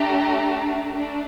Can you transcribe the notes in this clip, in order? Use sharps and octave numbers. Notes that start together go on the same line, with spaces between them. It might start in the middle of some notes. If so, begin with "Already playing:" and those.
Already playing: A3 D4 G4 A#5
A3 D4